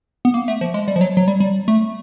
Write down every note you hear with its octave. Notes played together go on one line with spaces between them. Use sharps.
B3
A#3
A3
F3
G#3
G3
F3
F#3
F#3
G3
G3
A3